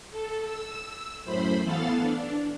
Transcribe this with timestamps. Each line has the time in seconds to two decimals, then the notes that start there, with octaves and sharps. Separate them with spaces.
0.11 A4
0.45 E6
1.25 F#2 A2 C5 B5
1.63 E3 B3 A4 F5 A6
1.99 D4